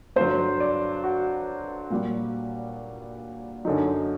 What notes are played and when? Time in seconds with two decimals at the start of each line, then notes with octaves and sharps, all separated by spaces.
0.16 G2 D3 F#3 C5
0.60 D5
1.03 F#4
1.90 A#2 G3
3.65 F#2 D3 F#3 D#4